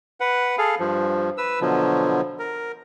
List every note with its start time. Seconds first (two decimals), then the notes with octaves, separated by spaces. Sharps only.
0.20 B4 F#5
0.58 G#4 A4 F5
0.79 G2 F3
1.38 B4 E6
1.61 B2 D3 F3 F#3
2.39 A#4